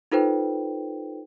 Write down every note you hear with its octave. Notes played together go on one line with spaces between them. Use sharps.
D#4 F4 A4 B4 C5 G5